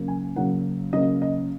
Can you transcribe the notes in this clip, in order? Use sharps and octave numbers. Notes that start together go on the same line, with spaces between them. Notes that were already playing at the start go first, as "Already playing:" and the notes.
Already playing: C#3 F#3 A#3
G#5
C#3 F#3 A#3 F#5
C#3 F#3 A#3 D#5
D#5